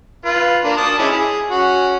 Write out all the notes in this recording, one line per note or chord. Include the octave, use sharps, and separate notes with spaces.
F4 B4
A#3 D4
A5 D6 D#6
G#3 C#4 E4
G#4
C#4 F#4